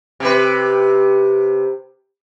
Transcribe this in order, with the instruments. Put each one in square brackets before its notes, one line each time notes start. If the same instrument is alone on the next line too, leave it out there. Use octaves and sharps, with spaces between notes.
[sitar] C3 G4 B4